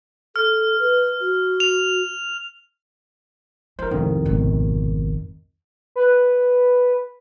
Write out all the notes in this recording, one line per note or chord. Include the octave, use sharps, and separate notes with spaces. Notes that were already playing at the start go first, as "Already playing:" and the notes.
A4 F6
B4
F#4
F7
E3 A#4 C5
C2 F2 G#2 D#3
G#1 B2
B4